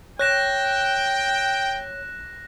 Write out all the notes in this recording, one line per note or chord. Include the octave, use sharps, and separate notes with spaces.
C#5 G5 F#6 A#6 E7